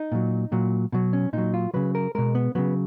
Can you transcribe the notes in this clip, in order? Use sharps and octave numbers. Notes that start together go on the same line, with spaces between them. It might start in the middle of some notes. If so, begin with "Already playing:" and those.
Already playing: D#4
A#2 F#3
A#2 F#3
B2 F#3
C#4
A#2 F#3 D#4
F4
C#3 F#3 B4
A#4
B2 G#3 A#4
B3
C#3 F#3 B3